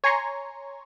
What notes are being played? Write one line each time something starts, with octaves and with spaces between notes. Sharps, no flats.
C#5 G#5 A#5 C6 C#6